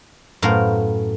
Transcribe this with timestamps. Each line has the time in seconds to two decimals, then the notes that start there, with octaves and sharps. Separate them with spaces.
0.42 F#2 A2 B3 A#4 C5 F5